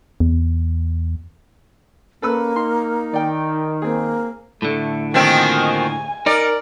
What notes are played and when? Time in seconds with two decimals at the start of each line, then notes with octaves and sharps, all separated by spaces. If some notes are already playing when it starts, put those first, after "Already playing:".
0.20 E2
2.22 A#3 C#4 A4 B4 E6
2.56 D#4 C6
3.14 D#3 D5 G5
3.82 A#3 C4 G#4
4.62 A2 D3 A3
5.14 D#3 F3 A#3 C4 F#4 D#5 G#5
6.26 D#4 A#4 D5